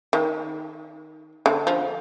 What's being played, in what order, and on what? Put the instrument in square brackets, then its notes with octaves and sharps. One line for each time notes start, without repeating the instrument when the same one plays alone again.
[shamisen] D#3
D3
F3